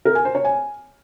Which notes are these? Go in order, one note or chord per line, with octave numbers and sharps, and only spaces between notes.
A#4
G#5
C5
C#5
G#5